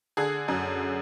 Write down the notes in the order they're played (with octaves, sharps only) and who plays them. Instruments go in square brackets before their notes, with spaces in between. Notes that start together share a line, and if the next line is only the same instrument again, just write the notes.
[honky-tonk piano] D3 G#4
F#2